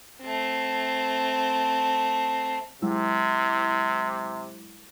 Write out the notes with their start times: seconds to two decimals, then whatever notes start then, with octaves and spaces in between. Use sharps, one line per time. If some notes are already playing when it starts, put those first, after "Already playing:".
0.21 A3 C4
2.82 C3 F#3 G#3 E4